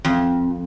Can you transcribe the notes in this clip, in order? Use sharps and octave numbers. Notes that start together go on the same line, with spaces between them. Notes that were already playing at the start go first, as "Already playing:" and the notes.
F2